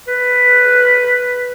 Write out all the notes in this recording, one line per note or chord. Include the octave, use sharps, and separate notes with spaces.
B4